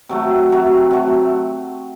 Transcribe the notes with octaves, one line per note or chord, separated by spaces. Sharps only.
C3 F#3 A3
C3 F#3 A3
C3 F#3 A3